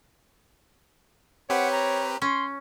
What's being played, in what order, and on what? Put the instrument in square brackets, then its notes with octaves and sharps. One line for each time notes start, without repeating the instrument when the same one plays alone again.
[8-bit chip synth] C4 G4 B4 [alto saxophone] C#5 [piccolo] F#5
[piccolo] A#5
[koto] C#4 [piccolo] C6